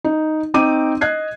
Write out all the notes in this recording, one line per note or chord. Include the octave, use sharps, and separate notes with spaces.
D#4
C4 D#4 D6 D#7
D#5 F#6 G#6 C7